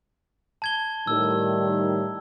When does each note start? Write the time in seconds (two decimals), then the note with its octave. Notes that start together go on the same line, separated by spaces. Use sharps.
0.62 A5 G#6 G7
1.07 A2 D#3 G3 E6